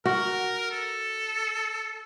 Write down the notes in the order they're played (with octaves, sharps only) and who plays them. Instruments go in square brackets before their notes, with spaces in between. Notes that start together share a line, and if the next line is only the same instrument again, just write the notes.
[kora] F#4 [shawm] A#4
[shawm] A4